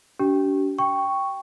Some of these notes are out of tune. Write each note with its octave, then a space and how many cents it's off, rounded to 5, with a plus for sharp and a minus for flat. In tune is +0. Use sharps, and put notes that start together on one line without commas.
D4 -40 G4 -40
G5 +0 C#6 +0